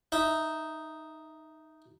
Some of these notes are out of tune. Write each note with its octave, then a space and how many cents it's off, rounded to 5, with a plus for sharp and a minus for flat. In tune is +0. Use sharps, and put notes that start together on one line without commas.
D#4 +0 E5 -15